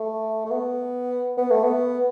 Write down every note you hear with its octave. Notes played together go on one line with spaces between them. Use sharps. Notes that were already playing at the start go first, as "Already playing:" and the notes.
Already playing: A3
A3
B3
B3
A3
B3